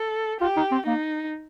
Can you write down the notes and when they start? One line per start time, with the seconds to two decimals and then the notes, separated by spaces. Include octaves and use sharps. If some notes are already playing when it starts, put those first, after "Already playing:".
Already playing: A4
0.41 F4 G4
0.57 D#4
0.72 C4
0.86 A#3 D#4